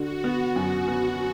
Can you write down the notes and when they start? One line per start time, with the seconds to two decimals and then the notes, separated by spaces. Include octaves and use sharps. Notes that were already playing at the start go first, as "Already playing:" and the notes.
Already playing: D3 F#4
0.24 B3
0.56 F#2
0.88 B3